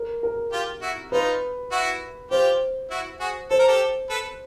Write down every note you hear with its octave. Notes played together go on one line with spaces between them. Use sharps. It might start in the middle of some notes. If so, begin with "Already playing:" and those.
Already playing: A#4
A#4
F4 G4
E4 F#4
D#4 F4 B4
E4 F#4
F4 G4 C5
E4 F#4
F#4 G#4
A4 C5
A#4
G4 A4
A4 B4